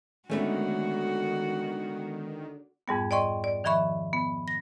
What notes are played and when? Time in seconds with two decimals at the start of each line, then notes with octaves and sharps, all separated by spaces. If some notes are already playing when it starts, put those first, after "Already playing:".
0.30 D3 D#3 G#3 A3 B3 C#4 F#4
2.88 F2 G#2 G3 B3
3.11 D5 D#5 G5 C6 C#6
3.44 D5
3.64 D#3 F3 E5 B5 C#6
4.13 B3
4.48 A#6